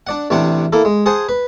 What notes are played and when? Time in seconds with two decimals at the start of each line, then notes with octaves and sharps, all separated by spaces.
0.07 D4 D5 F#5
0.30 A1 C3 C4 D4 D5 F#5
0.73 A#3 E4 A4
0.85 G#3
1.06 G#4 C5 F#5 G#5 A5
1.29 B4